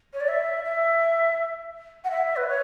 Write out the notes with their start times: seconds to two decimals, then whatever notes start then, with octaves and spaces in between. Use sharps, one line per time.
0.13 C#5
0.20 D5
0.28 E5
0.64 E5
2.04 F#5
2.10 E5
2.36 B4
2.48 C#5